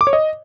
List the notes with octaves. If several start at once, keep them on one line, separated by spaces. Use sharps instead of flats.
D6
C#5
D#5